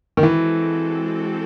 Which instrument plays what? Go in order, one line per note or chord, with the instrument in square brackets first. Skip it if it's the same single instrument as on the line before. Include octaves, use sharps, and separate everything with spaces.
[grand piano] D#3
[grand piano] E3 [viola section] G#3 C4 F#4 A4